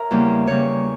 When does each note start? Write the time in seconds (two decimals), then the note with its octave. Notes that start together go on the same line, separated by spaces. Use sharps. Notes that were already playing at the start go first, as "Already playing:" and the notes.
Already playing: A#4 C#5 E5
0.11 E2 C#3 G3 A#3
0.47 E2 C#3 G3 A#3 C#5